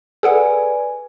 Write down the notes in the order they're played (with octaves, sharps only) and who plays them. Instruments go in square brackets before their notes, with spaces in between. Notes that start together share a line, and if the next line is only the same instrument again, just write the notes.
[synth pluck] G#4 A4 F#5 [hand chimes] B4 D5 G#5